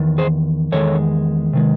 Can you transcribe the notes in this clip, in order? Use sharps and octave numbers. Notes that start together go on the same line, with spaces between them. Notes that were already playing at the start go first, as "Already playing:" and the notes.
Already playing: E2 D#3
G#4 C5
E2 D#3 G#3 A4 C#5
C3 D#3 G#3